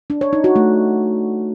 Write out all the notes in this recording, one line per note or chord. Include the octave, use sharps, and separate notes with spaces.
D4
C#5
D#4
F#4
A3